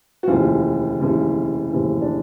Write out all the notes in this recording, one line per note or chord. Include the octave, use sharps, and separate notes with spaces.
F#4
F1 D#2 C#3 E3 F4
F1 D#2 C#3 E3
F1 D#2 C#3 E3
D4